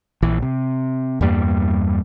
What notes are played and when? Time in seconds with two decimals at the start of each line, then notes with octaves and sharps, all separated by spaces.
0.22 A#1 E3
0.42 C3
1.21 E2 G2 G3 A#3